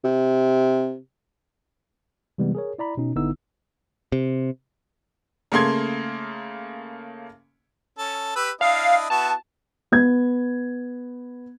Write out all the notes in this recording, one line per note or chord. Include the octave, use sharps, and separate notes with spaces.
C3
C3 E3 G3 G#3 B3
G#4 A#4 C#5
E4 D5 A#5 B5
B2 C#4 D#4
G#1 D3 B3 D#4 E4 E6
C3
C#3 A3 A#3 C6 G#6
C#4 A4
G4 B4 E6
D4 E4 D#5 F5
B3 E4 F#4 A5
B3 G#6